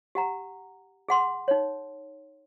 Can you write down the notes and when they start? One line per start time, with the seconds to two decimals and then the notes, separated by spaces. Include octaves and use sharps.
0.15 G4 F#5 A#5
1.09 G#4 F#5 C6
1.48 D#4 C#5